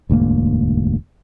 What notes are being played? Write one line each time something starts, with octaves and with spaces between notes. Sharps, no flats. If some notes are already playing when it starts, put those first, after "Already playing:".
E1 D2 G#2 A#3